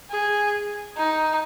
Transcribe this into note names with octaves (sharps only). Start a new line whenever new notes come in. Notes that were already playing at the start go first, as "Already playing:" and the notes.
G#4
D#4